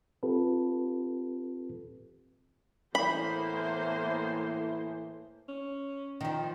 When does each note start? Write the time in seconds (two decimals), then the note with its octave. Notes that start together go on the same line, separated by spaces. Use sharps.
0.23 C4 F4 G4 A4 B4
2.95 A2 E3 A#3 B3 C5 B5
5.49 C#4
6.21 D#3 F3 D#4